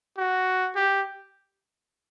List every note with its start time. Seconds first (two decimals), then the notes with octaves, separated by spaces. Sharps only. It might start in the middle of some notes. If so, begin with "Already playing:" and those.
0.17 F#4
0.75 G4